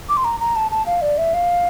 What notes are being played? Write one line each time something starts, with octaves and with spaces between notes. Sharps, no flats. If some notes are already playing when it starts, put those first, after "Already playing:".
D6
C6
A#5
A#5
A5
A5
F5
D5
E5
F5